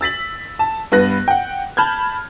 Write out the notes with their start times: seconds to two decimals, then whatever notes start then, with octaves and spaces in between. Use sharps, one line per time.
0.01 E6 A6 B6 F#7
0.59 A5
0.92 G2 B3 B4 F#6 A#6
1.28 F#5 G5
1.77 A5 B5 F6 G6 G#6